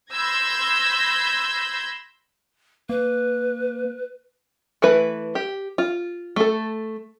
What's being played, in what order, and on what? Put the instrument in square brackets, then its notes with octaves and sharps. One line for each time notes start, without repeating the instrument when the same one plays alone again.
[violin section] B5 C6 E6 G6 G#6 A#6
[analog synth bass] A#3 [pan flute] B4
[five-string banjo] E3 A3 E4 B4
G4
F4
A3 A4